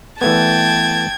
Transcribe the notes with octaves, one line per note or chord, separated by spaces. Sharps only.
E3 A3 B3 G5 A5 G#6